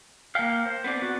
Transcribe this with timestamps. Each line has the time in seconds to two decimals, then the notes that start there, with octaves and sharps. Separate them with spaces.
0.35 A#3 F5 G5 F6
0.66 C5
0.84 B3 C4 D5
1.02 F#4